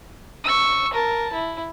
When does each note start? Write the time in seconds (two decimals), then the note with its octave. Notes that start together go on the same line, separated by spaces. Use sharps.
0.44 C#6 E6
0.93 A#4 A5
1.32 E4